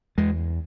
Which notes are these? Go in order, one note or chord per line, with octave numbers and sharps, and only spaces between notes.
E2 G#3